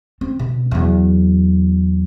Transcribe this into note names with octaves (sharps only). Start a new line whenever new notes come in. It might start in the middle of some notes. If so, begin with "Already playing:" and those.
C4
B2
E2 F#3